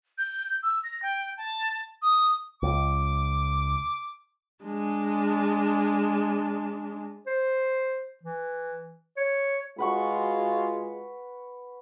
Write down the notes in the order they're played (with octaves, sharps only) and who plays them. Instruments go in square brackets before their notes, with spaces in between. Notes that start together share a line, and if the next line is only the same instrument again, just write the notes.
[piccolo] G6
E6
A#6
G5
A5
D#6
[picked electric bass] C#2 [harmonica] D6
[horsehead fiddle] G#3 D4
[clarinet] C5
E3
C#5
[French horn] G#3 [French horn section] F4 F#4 [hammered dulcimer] B4 F#5 C#6